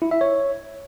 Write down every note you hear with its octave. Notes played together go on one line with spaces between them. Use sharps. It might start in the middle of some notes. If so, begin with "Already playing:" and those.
E4
E5
C#5